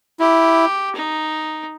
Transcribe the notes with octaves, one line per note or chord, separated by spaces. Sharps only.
E4 G4
D#4